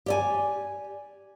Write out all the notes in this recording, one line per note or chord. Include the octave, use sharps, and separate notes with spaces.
G4 D5 G#5